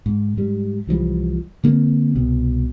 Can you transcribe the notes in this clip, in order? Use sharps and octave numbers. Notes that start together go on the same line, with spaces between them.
G#2
G#2 G3
C2 E3 F3 G3
D3 A#3 C4
C2 B2